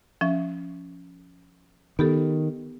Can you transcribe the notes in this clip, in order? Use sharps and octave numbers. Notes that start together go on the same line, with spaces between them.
F3 C#4 E5
D#3 B3 G4 A4